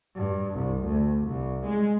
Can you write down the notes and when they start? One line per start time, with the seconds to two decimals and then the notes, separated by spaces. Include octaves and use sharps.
0.16 G2
0.54 C2
0.85 D2
1.26 C2
1.66 G#3